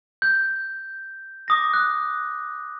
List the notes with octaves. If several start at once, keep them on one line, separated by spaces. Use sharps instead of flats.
G6
D6 D#6 A#6
F#6